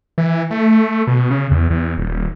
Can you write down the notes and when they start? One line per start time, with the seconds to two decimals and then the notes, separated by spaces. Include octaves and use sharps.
0.18 E3
0.51 A3
1.07 B2
1.30 C#3
1.51 E2
1.70 E2
1.98 D#1